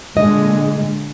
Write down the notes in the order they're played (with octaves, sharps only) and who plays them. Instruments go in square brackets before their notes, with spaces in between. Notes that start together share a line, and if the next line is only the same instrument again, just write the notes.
[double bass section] A#2 D3 G#3 [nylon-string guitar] D#5